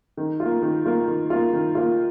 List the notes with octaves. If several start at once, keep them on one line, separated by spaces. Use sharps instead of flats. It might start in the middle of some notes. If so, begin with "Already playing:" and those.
D#3
F4
A#3
D#3
A#3 F4
D#3
A#3 F4
D#3
A#3 F4